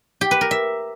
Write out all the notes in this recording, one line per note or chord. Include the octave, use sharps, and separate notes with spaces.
G4
B4
A#4
E5